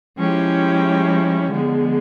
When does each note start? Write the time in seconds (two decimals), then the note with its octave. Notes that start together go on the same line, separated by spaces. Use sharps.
0.17 F3 G#3 C#4 E4 G4
1.52 D3 F3 G#3 B3